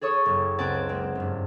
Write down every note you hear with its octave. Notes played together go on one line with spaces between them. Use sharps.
G#4 A4 C#5 C#6 D#6
F#1 A#3
C#2 C4 F#5 G#5 A5 D7
G#3 A#3 C4
F#1 G2